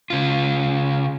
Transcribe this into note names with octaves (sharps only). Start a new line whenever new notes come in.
C#3 F4